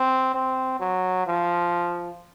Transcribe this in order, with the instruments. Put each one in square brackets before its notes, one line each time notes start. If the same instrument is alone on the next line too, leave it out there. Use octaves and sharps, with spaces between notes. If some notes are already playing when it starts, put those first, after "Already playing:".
Already playing: [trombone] C4
C4
F#3
F3